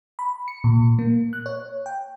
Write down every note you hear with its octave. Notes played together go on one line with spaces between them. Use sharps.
B5
C#7
A#2
A#3
F#6
C#5
G5